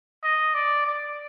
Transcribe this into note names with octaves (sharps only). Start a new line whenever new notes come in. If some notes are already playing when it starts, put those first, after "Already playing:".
D#5
D5
D5